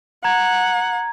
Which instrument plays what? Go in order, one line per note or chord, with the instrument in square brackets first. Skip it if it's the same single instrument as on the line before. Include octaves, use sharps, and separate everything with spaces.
[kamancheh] F#5 [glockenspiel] A#5 G#6